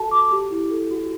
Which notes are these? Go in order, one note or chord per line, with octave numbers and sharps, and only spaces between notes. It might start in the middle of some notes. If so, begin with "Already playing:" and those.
Already playing: F#4 A4 A5
F#4 D6
G4
E4
A4
F#4